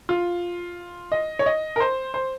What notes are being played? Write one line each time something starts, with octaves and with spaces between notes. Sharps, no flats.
F4
D#5
C#5
D#5
A#4
C5
C5